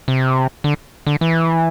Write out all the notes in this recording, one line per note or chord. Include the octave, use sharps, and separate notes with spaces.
C3
D3
D3
E3